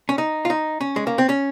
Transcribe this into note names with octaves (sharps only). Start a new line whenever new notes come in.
C#4
D#4
F4
D#4
C#4
G#3
A#3
C4
C#4